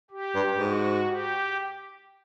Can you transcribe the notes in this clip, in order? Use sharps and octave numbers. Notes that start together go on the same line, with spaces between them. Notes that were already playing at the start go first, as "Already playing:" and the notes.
G4
G2
G#2 F#4
G4